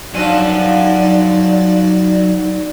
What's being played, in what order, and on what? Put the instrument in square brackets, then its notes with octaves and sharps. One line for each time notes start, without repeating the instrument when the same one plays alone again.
[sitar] G2 F3 F#4 [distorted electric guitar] F#3 G#5 [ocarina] D#4 [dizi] D5